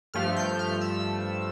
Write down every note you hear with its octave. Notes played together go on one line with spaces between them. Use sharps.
G2 F3 A3 F6
G6
G6
F6
E6